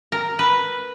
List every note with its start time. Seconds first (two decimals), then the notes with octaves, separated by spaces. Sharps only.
0.12 A#4
0.39 B4